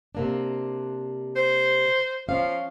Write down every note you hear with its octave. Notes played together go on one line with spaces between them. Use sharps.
C3 A#3 D4
C5
F3 C#4 F5